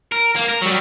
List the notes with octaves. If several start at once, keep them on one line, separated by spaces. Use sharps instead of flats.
A#4
A#3
A#4
F#3 G3